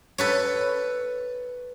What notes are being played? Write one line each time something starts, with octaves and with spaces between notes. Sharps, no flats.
A4 B4 C#5